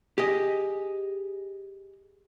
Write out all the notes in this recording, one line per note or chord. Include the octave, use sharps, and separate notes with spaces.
G4 G#4 D#5